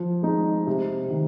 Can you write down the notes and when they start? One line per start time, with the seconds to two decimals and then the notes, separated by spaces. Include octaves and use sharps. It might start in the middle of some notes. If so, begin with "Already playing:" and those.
Already playing: F3
0.22 G#3 D#4
0.67 C3
1.11 D#3